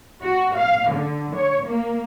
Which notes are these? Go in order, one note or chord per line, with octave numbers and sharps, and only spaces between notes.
F#4
F5
D3
C#5
A#3